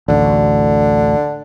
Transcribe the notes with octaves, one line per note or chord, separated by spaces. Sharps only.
A1 D2 D3